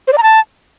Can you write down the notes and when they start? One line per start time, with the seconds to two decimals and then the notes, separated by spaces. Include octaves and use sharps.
0.08 C5
0.13 D5
0.18 A#5
0.23 A5